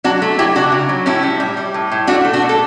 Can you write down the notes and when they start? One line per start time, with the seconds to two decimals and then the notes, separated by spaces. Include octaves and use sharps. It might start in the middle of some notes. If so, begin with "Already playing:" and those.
0.04 F#3 D4 F#4
0.22 A3
0.38 F#3 E4 G4
0.55 C#3 D4 F#4
0.72 C#3
0.89 F#3
1.06 A2 C#4 E4
1.23 G3
1.40 G3
1.57 G3
1.74 A2
1.92 A2
2.07 A3 D4 F#4
2.25 A3
2.33 D4 F#4
2.42 B2
2.49 A4